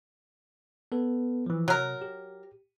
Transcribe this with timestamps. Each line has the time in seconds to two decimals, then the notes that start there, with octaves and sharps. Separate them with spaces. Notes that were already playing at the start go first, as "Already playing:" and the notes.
0.92 B3 A4 B4
1.46 E3 F3
1.68 C3 F#3 A#4
2.02 G4